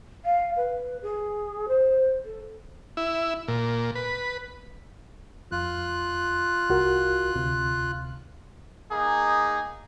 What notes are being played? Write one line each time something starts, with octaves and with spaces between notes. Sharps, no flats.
F5
B4
G#4
C5
A4
E4
A#2
B4
F2 F4 F#6
C2 F#4 A#4
D2 C3
A#3 D#4 G#4